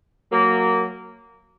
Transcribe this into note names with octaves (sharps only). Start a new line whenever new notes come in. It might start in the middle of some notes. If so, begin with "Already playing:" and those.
F#3 A#3